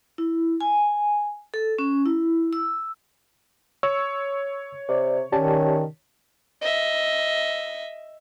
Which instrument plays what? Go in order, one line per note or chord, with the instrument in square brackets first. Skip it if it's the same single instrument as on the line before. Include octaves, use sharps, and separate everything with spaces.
[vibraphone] E4
G#5
A4
C#4
E4
E6
[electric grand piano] C#5 [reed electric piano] C#6 E6
[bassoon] C3 [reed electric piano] D5
[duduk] D#3 [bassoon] C#4 [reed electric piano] G4 D5 A5
[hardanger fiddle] D#5 E5